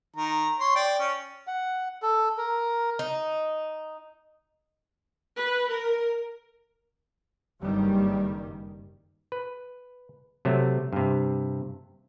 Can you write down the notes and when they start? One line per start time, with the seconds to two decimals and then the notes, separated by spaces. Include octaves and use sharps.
0.16 D#3 A#5
0.60 C#5 C6
0.75 D5 G5
1.00 C#4
1.47 F#5
2.02 A4
2.38 A#4
2.99 D#4
5.36 B4
5.71 A#4
7.61 F#1 G2 D#3 G3
9.32 B4
10.45 C3 F#3 A3
10.93 G2 C3